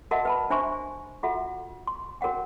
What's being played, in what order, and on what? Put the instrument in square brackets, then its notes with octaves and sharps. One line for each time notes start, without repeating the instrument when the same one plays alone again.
[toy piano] F#4 A#4 D#5 E5 F#5 A5
B4 A5 B5
D4 C5 E5 G#5 C6 C#6
F4 F#4 A4 E5 F#5
C6
F#4 A#4 C#5 F#5 G5